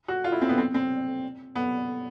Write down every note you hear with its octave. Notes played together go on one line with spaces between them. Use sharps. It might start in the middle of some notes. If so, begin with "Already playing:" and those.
F#4
F4
E4
C4
B3
C4
C4
B3